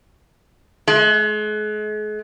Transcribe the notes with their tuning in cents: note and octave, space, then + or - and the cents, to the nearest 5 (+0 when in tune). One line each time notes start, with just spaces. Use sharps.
G#3 +40